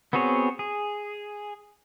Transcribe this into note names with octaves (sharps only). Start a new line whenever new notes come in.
B3 C4 F#4 G#4 C#5
G#4